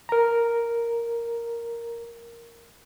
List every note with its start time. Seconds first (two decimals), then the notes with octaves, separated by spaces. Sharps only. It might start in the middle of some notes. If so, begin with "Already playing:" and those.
0.09 A#4 A#5